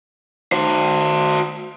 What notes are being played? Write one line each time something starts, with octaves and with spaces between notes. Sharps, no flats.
F#4 C5